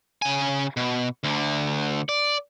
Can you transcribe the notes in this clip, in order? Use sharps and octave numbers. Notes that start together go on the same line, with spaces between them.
C#3 G#5
B2
D2 D3
D5